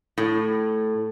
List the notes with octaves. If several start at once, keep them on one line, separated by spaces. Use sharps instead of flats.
A2